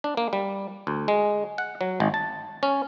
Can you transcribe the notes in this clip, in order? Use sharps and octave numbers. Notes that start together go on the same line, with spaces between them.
D4
A#3
G3
D2
G#3
F#5
F#3
G#1
A5
C#4